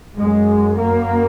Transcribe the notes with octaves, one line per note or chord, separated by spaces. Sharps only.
F#2 G#3
A#3